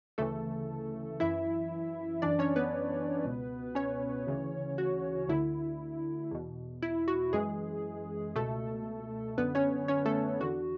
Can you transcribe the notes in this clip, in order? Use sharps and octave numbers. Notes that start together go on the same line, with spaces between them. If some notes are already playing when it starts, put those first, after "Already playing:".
D2 C#3 E3 A3 A4
F#2 E3 E4 E5
F#2 E3 D4 D5
C#4 C#5
B3 B4
C#2 B2
C#4 C#5
D2 C#3 E3
F#4
D2 D3 E4
E2 B2
E4
F#4
F#2 E3 G#3 G#4
C#2 B2 A3 A4
F#2 D3 B3 B4
C#4 C#5
C#4 C#5
A3 A4
E2 D3 F#4